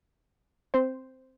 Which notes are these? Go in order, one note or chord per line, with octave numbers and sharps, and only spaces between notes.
C4 C5